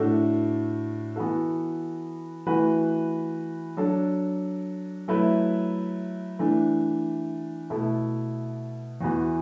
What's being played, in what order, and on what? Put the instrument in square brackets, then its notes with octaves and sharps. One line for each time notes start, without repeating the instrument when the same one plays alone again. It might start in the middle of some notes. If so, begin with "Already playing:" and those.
Already playing: [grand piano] A2 A3 D4 F#4 A4
E3 B3 F#4 A4
E3 A3 F#4 B4
F#3 D4 A4
F#3 A3 E4 B4
E3 A3 D4
B2 A3 E4 A4
E2 E3 B3 F#4